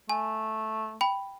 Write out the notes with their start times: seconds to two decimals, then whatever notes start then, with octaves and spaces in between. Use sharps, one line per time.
0.09 A3 G#5
1.01 G5 B5